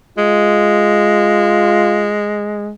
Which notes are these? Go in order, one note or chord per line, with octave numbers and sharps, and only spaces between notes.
G#3 F4